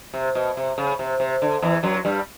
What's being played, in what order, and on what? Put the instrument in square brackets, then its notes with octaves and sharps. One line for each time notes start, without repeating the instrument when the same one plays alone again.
[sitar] C3
B2
C3
C#3
C3
C3
D3
E2 E3
F#2 F#3
G2 G3